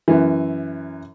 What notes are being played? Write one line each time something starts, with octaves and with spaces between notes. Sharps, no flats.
F#2 E3